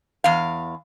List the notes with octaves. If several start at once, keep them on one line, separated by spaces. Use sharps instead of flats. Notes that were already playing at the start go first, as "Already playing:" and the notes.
E2 F5